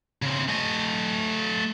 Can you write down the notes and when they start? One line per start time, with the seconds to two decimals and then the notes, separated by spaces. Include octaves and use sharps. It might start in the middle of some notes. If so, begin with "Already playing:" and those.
0.22 C#3 C4
0.49 A3 D#5